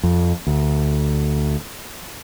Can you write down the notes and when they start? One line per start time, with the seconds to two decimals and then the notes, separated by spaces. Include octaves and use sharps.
0.03 F2
0.47 D2